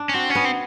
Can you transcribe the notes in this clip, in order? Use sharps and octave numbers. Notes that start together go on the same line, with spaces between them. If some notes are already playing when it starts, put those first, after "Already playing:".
Already playing: D4
C#4
C4 F#4
C#4
B3
C4